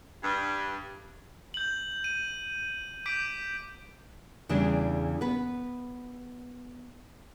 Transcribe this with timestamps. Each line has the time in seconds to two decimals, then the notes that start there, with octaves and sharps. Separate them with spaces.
0.23 G2
1.54 G6 F#7
2.04 D#7
3.06 D6 G6 B6 D7
4.49 E2 C#3 E3 G3 D4
5.21 B3 B4